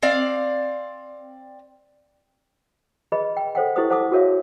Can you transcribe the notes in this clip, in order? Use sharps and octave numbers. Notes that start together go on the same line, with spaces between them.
C4 D5 F5
G#4 B4 D#5 B5
G5
A4 C5 F#5 G5
E4 G4 A4 B4 C5 D#6
A4 C5 F#5 A5 D6 D#6
F#4 G#4 A#4 C#5 E5 F5